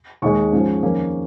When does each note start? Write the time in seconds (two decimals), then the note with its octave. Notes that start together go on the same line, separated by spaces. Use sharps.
0.22 D#2 D#3 G#3 C#6
0.52 G#2 F3 C#4
0.83 F2 D#3 A#3 C#4